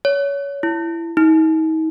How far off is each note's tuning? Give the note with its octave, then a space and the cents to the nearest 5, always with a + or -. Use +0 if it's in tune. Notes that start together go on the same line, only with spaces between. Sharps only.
C#5 +20
E4 +15
D#4 +40